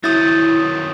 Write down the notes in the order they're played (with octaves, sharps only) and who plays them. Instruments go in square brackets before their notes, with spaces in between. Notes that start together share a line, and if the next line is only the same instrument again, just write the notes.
[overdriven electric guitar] D#3 F#3 [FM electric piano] E4 [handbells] D#6 G6 A6